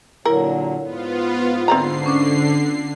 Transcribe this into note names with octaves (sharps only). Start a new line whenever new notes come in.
A#2 D3 F#3 E4 A#4
G#2 B3 F4
D3 C4 D5 A#5 C7
C#4 D4